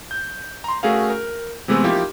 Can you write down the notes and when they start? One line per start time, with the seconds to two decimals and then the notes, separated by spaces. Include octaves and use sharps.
0.11 G6
0.64 A#5 C6
0.83 A3 C#4 F#4 G#4 A#4 F5
1.10 A#4
1.68 C3 E3 G#3 A3 B3 C4
1.84 F3 A#3 D#4 E4 G4